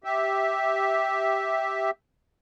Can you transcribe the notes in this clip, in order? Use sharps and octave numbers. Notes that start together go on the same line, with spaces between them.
G4 E5